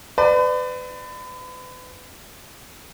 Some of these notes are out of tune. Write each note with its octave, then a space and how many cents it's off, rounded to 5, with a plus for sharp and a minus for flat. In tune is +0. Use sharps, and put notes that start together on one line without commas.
B4 +35 D5 +20